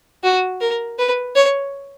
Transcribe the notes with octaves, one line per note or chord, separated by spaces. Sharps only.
F#4
A#4
B4
C#5